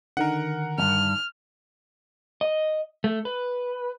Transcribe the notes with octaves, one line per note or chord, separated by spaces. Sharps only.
D3 D#3 A#4 F#5
E2 G2 F6
D#5
A3
B4